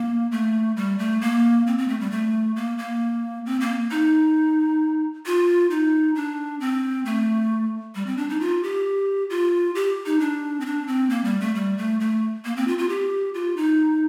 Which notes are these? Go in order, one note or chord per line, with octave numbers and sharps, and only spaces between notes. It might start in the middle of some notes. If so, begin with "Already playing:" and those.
Already playing: A#3
A3
G3
A3
A#3
C4
C4
A3
G3
A3
A#3
A#3
C4
A#3
D#4
F4
D#4
D4
C4
A3
G3
C4
D4
D#4
F4
G4
F4
G4
D#4
D4
C4
D4
C4
A#3
G3
A3
G3
A3
A3
A#3
C4
F4
F4
G4
F4
D#4